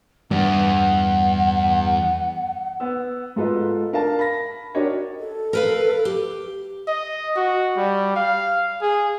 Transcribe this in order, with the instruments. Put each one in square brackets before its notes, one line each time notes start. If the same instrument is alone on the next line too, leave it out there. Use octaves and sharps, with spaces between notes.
[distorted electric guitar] E2 [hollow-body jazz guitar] G2 [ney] F#5
[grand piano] B3 E6
G#2 F4 A4 B4 D#5
D4 A#4 F5 A5
B5 A#6
D4 F#4 G4 A#4 C#5 D#5
[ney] A4
[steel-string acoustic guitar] A#4 B4 F5
G4
[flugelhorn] D#5
F#4
G3
F5
G#4